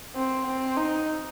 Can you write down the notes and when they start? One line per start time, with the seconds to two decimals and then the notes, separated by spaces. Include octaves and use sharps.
0.16 C4
0.46 C4
0.77 D#4